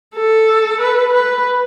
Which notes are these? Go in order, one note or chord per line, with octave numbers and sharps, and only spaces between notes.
A4
B4
B4